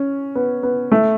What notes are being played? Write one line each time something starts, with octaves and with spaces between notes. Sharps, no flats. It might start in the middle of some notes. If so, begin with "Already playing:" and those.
Already playing: C#4
B3
B3
A3